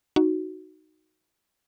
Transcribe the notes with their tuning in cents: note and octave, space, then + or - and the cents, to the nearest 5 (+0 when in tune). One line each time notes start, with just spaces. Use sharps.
D#4 +0 F#4 +0